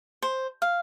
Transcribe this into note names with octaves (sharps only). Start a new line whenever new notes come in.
C5
F5